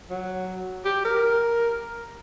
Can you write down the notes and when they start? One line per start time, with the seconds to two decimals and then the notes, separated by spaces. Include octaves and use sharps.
0.10 F#3
0.85 G4
1.05 A#4